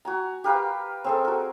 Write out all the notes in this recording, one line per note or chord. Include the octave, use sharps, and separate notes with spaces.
F#4 G#5 A#5
G4 A#4 B4 F5
C4 G#4 A4
F#4 A#4